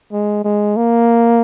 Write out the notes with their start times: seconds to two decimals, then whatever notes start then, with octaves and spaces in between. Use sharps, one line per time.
0.12 G#3
0.44 G#3
0.77 A#3